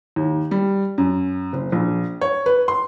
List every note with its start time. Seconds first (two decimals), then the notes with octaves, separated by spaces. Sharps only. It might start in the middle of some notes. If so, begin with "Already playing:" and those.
0.16 D#2
0.51 G3
0.98 F#2
1.53 F#1
1.72 A#1
2.21 C#5
2.46 B4
2.68 C6